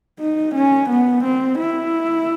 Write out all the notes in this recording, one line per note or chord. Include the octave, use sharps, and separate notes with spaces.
D#4
C#4
B3
C4
E4